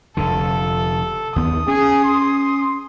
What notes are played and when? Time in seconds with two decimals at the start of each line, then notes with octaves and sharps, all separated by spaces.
0.17 F1 F2 D3 A4
1.36 D#2 B3 D#6
1.68 C#4 G#4
2.04 C6